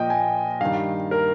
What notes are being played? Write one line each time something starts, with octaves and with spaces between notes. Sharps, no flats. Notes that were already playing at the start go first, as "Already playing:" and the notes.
Already playing: A#2 F3 D#5 G5
G#5
G2 D#3 F5
A#4